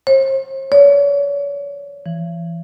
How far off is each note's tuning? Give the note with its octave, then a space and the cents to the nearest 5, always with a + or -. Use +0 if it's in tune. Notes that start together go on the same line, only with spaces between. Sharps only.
C5 +45
C#5 +40
E3 +40